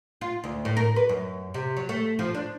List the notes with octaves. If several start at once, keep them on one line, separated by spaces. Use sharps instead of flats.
F4
D2
A2
A#4
B4
F#2
C3
F#3
A3
F3
D4